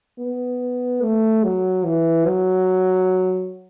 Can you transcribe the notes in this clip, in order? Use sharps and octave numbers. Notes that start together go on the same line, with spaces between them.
B3
A3
F#3
E3
F#3